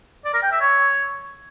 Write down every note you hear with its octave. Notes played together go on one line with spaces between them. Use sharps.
D5
A#4
G5
E5
C#5